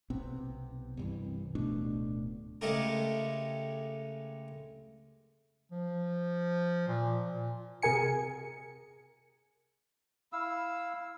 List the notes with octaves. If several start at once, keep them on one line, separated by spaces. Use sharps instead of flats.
B1 C3 B3 C4
C2 G2 E3
D1 B2 A3 D4
C#3 G#3 A3 G4 A4 A#4
F3
A#2
A#2
C3 G#4 A#4 G#5 C#7
E4 F5 E6